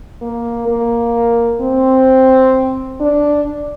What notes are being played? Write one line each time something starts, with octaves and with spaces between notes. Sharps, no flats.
A#3
A#3
C4
D4